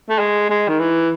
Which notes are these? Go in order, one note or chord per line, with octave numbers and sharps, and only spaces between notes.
A3
G#3
G#3
D#3
E3